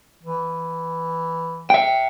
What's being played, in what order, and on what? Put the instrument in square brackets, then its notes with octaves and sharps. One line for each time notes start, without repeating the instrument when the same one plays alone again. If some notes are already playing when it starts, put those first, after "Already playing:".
[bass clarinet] E3
[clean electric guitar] E5 G5